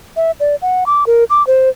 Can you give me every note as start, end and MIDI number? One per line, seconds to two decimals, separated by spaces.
0.16 0.31 76
0.40 0.55 74
0.62 0.84 78
0.86 1.04 86
1.07 1.24 70
1.30 1.45 86
1.47 1.69 72